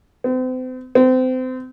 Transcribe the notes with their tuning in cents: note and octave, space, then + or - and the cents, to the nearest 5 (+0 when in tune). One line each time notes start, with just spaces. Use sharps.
C4 -40
C4 -30